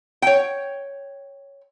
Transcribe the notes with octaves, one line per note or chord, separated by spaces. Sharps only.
C#5 G5